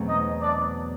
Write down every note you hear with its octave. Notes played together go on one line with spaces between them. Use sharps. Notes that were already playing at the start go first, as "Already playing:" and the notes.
Already playing: E2 B2 F#3 A3 C4
D#4 D#5
D4 D5